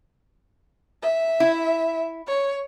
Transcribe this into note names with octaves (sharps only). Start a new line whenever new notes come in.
E5
E4
C#5